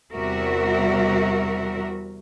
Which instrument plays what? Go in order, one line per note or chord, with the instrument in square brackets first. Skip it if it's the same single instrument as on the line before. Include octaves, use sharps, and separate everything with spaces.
[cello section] E2 C3 G3 F#4 A#4 E5